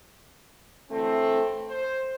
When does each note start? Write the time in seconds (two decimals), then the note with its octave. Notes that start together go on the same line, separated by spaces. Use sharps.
0.90 D2 E3 A3 C4
1.69 C5